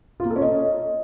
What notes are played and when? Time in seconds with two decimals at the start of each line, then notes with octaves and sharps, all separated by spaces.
0.20 F4
0.25 A#3
0.31 A4
0.36 C#4
0.41 D#5